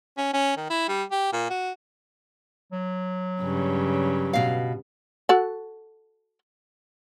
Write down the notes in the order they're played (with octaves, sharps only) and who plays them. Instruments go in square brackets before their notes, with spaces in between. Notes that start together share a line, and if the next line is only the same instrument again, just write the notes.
[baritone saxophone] C#4
C#4
D#3
E4
G3
G4
A#2
F#4
[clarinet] F#3
[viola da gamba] G2 C#3
[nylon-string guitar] B2 F5
[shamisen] F#4 A4 F#5